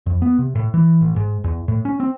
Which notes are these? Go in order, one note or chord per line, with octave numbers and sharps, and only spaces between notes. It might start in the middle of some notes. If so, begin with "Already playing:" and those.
F2
B3
C3
A2
E3
A1
G#2
E2
A2
C#4
C4